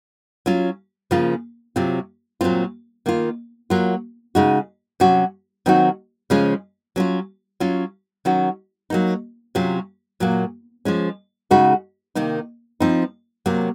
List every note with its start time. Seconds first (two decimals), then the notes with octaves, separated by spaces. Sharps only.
0.46 F#3 C#4 F4
1.11 C#3 F3 A#3 F4
1.76 C3 F#3 C4 F4
2.41 A#2 F#3 C4 F4
3.06 D#3 A#3 F4
3.70 F#3 A#3 F4
4.35 C#3 G#3 D#4 F#4
5.00 C3 F#3 C#4 F#4
5.66 D#3 F#3 C4 D#4 F#4
6.30 C#3 F3 G#3 C#4 F4
6.96 F#3 C#4 F4
7.60 F#3 C#4 F4
8.25 D#3 F#3 C#4 F#4
8.90 F#3 A#3 D#4
9.55 C3 F#3 C#4 F4
10.20 A#2 F#3 A#3
10.85 F3 G#3 C#4
11.51 C#3 G#3 D#4 F#4
12.15 C3 D#3 A#3 D#4
12.80 F3 C4 D#4
13.46 C3 F#3 A#3